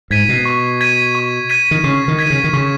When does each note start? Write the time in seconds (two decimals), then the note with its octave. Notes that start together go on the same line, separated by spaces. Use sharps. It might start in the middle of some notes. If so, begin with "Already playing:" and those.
0.11 G#2 G#6 B6 D#7
0.29 B2
0.46 C#6
0.81 G#6 B6 D#7
1.15 C#6
1.50 G#6 B6 D#7
1.71 D#3
1.84 C#3 C#6
2.08 D#3
2.19 G#6 B6 D#7
2.30 C#3
2.44 D#3
2.53 C#3 C#6